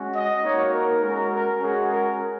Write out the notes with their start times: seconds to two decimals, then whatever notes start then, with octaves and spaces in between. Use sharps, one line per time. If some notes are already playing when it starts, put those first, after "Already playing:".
Already playing: G#3 C#4 F#4
0.14 D#5
0.43 A#3 D#4 F#4 C#5
0.73 A#4
1.02 G#3 C#4 F#4 A#4
1.31 A#4
1.61 G#3 C#4 F#4 G#4
1.91 A#4